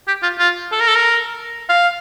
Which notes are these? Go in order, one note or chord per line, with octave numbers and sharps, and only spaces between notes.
G4
F4
F4
A4
A#4
A4
A#4
F5